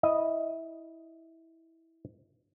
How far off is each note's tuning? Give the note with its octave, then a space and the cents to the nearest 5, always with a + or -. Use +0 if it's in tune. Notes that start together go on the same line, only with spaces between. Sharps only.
E4 -15 D#5 +0